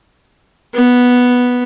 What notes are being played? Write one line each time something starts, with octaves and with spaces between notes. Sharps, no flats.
B3